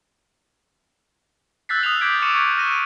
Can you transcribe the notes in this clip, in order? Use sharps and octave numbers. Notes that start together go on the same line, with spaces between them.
E6 F#6 G6 A6 B6 C7
D#6 F6 F7
D6 G6 G#6 B6 D7
C#6 D6 C#7 D#7 E7
C#6 G#6
F6 A#6 D#7 E7